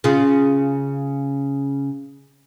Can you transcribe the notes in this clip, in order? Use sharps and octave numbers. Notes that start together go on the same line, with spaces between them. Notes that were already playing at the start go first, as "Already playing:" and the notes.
C#3 F4